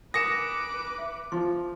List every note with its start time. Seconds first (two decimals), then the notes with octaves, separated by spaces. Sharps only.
0.14 A#4 B4 G#5 D6 D#6 A#6 C#7 E7
0.98 E5
1.32 F3 C6